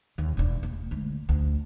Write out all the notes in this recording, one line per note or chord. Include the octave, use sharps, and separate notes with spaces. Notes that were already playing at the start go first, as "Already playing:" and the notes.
D#2
E1 D4
A#3
D2 G#3
D2